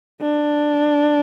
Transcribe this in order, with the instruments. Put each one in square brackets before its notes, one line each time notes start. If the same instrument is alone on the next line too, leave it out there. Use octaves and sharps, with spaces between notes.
[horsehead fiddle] D4